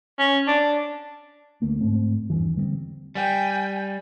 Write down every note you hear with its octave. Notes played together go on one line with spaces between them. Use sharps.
C#4
D4
D2 A3 A#3
G#2 A3 C4
E2 G2 E3
D3 G3 A3 C4
G3 G5 G#5